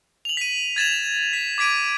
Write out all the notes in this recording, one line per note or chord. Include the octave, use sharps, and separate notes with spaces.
F7 F#7
B6 D#7
G#6 A6 E7 F7
B6
D6 G#6 B6 D7 D#7